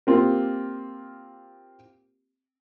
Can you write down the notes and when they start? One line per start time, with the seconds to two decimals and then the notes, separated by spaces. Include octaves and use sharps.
0.07 A#3 C4 F4 G4